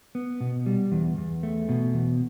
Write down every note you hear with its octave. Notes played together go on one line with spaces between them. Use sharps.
B3
B2
G3
E2
E2
A3
B2
E2